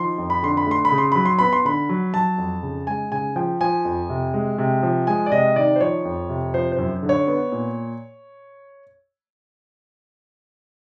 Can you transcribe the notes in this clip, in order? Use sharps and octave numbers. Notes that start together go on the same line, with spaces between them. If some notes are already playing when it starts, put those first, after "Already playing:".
Already playing: D#3 F3 C6
F2
B5
D3 C6
B5
A3 C6
B5
C#3
C6
F#3 B5
C6
B3 B5
C6
D3 B5
F#3
F#3 A5
F2
C#3
G#3 G#5
C#3 G#5
F3 G5
F3 G#5
F2
C3
G#3
C3
F3
G#3 G#5
D5
C3 D#5
D#3 D5
C5
F3 C#5
F2
C3
F3 C5
C5
F#2
D3
C#5
B3
A#2